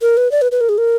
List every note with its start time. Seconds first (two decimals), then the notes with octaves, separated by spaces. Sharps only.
0.02 A#4
0.17 B4
0.32 D5
0.42 B4
0.52 B4
0.61 A#4
0.69 G#4
0.78 A#4